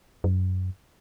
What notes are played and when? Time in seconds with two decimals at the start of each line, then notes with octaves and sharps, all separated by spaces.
0.24 F#2